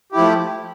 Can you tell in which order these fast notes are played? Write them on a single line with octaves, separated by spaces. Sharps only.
G4 E4 F3 A3